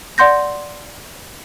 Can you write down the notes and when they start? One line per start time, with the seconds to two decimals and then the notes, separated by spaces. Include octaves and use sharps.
0.18 D5 F#5 C6 G6 A#6